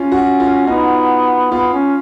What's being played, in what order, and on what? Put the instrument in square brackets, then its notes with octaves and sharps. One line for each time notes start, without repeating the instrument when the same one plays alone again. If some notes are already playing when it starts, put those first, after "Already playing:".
Already playing: [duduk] C#4 [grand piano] F4
[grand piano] F#4
F4
[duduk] B3 [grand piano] D#4
[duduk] B3 [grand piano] F4
[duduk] C#4